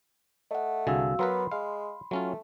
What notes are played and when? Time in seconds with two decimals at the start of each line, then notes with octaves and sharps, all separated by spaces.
0.51 A3 D#5 F#5
0.87 C2 D3 F#4 G#4 F5 E6
1.19 F#3 B3 A#4 B4 B5 C6
1.51 G#3 F5
2.11 F#3 A3 C#4 F4